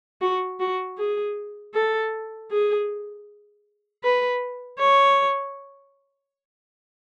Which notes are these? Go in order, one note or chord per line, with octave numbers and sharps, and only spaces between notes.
F#4
F#4
G#4
A4
G#4
B4
C#5